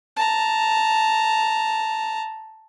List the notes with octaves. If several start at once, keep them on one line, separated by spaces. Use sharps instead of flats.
A5 A#5